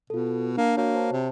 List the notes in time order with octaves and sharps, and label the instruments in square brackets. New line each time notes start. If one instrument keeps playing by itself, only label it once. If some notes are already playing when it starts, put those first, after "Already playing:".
[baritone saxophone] B2 [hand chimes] F4 A4
[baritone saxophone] A#3 [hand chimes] D4 A5
[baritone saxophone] A#3 [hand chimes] F#4 C#5
[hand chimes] C5 A5
[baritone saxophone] C3